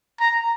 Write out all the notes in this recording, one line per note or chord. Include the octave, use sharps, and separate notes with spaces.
A#5